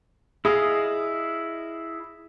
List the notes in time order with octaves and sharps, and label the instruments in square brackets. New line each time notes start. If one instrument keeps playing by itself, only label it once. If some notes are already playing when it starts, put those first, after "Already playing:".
[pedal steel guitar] E4 D#5 F5 [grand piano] G#4